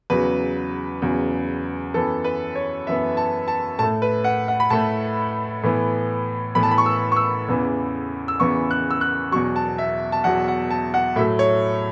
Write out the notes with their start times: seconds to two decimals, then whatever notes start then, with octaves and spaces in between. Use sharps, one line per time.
0.10 E2 C#3 F#3 B4
1.02 E2 C#3 F#3
1.94 F#2 E3 B3 A4
2.24 B4
2.56 C#5
2.87 F#2 E3 B3 E5
3.17 A5
3.48 A5
3.79 A2 A3 A5
4.02 B4
4.24 F#5
4.48 F#5
4.60 B5
4.70 A2 A3 A5
5.63 A2 E3 B3
6.55 A2 E3 B3 B5
6.63 A5
6.71 B5
6.78 C#6
6.86 E6
7.12 C#6
7.17 E6
7.48 E2 C#3 E3 B3
8.28 E6
8.40 E2 C#3 E3 B3 C#6
8.71 F#6
8.91 E6
9.01 F#6
9.32 E2 B2 F#3 C#6
9.56 A5
9.78 E5
10.12 A5
10.24 E2 B2 F#3 F#5
10.48 F#5
10.71 A5
10.94 F#5
11.16 A2 F#3 A3 E5
11.39 C#5